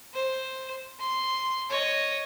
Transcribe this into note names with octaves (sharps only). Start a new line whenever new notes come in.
C5
C6
C#5 D#5